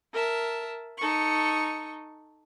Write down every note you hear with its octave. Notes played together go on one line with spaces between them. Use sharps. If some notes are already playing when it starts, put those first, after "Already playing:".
A#4 E5 A5
D#4 A4 C#6